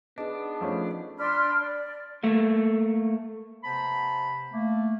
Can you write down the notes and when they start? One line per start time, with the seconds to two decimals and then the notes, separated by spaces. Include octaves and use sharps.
0.18 B3 D4 D#4 G#4 D#5
0.61 F3 A3 C#4
1.18 D4 B5 C6 F6
1.61 D5
2.23 A3 A#3
3.64 C3 B3 C5 A5 B5
4.52 A3 A#3